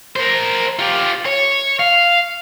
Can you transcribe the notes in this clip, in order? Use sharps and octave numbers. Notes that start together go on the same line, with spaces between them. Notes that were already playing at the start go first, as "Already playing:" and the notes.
A#4 C5
F4 G4
C#5
F5